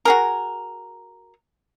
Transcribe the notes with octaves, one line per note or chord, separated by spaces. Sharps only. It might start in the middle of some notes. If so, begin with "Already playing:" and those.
F#4 G#4 A#4